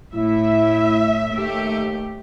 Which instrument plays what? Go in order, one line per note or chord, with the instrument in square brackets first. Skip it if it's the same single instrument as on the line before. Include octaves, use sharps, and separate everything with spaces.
[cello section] A2 [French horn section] E4 [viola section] E5
[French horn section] D#2 [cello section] A3 G4